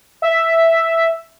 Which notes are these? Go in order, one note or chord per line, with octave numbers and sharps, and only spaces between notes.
E5